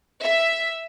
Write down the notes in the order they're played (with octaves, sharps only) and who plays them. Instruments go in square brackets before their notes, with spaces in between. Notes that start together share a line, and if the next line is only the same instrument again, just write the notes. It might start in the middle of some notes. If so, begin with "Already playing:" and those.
[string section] E5